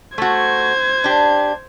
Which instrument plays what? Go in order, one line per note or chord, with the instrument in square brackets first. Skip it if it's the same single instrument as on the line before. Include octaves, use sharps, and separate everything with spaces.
[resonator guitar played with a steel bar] A3 F#4 [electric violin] C5 G#6
[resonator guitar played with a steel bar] D4 G4